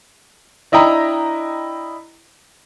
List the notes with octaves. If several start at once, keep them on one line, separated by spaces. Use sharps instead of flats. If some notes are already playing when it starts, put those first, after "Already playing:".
D4 E4 D#5 G5 A#5 B5